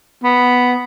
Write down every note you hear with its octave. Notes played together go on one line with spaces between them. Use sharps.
B3